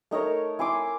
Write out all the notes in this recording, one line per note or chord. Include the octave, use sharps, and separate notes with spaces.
A3 D#4 A#4 C#5
E4 G#5 C6 D6